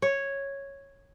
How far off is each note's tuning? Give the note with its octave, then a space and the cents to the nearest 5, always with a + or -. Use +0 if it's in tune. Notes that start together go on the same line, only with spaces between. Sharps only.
C#5 -5